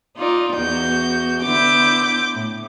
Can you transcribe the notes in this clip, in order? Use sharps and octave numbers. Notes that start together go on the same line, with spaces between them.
D#4 F4 D5
E2 F#4 G6
D3 B3 E4 D6 G6
A2